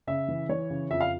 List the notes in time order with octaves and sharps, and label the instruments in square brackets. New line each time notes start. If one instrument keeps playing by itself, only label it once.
[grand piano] C#3 E5
E3
E3 C#5
C#3
F2 E5
F5